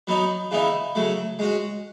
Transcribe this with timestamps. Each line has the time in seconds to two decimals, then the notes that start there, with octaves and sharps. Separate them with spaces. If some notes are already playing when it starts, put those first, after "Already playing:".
0.07 F#3 B3 D#4
0.51 C#3 E3 B3 D#4
0.95 C#3 F#3 A3
1.39 G#3 C#4 F#4